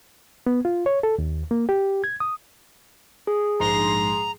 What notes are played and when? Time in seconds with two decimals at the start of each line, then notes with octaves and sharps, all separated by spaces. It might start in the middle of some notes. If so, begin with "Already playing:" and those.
0.47 B3
0.65 F4
0.86 C#5
1.03 A4
1.18 D#2
1.51 A#3
1.69 G4
2.04 G#6
2.20 D#6
3.27 G#4
3.60 A#1 G#2 A#5 C6